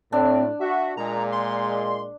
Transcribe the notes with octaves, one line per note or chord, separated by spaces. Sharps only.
A2 C4 D4
F#4 E5
A#2 G#3 A#5
C6